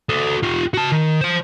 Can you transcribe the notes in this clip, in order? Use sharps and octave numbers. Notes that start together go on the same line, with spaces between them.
F#4 A4
F4 G4
F#4 A5
D#3
C5 A5